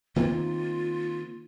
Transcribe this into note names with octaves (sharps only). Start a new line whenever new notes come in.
D#3 A#3 C4 F4